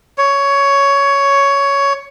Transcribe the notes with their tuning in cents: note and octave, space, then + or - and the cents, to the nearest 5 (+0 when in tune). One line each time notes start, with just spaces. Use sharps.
C#5 +10